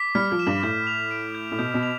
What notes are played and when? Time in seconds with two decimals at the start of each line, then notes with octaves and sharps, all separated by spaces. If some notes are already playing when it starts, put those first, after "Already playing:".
Already playing: D6 B6
0.15 G3 F6
0.32 F3
0.39 E7
0.47 G2
0.63 A2 G6
0.87 F7
1.11 D7
1.35 G6
1.52 A2
1.58 B2 G6
1.74 B2
1.83 F7